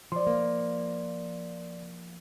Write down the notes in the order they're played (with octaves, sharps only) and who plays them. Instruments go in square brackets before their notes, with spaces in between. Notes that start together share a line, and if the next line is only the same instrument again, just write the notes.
[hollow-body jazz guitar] F3 [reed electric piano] D5 C6
[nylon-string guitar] A#3